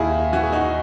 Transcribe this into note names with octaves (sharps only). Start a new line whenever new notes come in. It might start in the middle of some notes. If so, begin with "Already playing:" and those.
Already playing: D#2 D#3 D#4 E4 G#4
E3 F#4
G#4
D#4 F#4